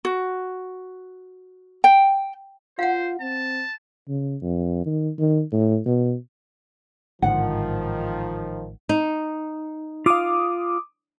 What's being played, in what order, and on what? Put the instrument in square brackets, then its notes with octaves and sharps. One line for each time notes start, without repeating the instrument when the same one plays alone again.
[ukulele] F#4
G5
[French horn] F4 [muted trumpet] C5 [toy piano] F5 F#5
[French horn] C4 [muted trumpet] A5
[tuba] C#3
F2
D#3
D#3
A2
B2
[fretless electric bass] A1 G#2 D3 [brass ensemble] D#3 F3 [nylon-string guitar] F#5
[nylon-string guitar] D#4
[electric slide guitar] F4 F5 [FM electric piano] D6 D#6